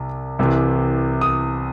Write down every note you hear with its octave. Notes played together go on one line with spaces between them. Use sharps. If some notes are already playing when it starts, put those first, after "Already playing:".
Already playing: C2 C3
C2 C3 E3
D#6